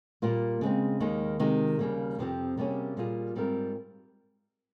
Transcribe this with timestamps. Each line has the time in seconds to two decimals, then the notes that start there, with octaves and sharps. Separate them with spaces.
0.22 A#2 G3 A#3 F4
0.61 C#3 G#3 C4
1.00 D#2 D#3 G#3
1.39 C3 D#3 G#3
1.79 D#2 C#3 G3 A#3
2.18 F2 C3 F3 C4 G4
2.57 C3 G3 A#3 C#4 G#4
2.97 A#2 G3 A#3 F4 G#4
3.35 G#2 G3 C4 F4 A#4